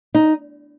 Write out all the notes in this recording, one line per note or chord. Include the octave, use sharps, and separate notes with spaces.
D#4